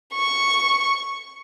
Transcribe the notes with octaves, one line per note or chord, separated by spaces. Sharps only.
C#6